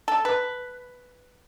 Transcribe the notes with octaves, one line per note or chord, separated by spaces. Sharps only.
A4
B4